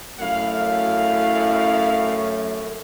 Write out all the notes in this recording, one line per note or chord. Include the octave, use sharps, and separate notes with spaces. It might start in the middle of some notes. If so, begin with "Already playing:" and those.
F#2 A3 E4 F5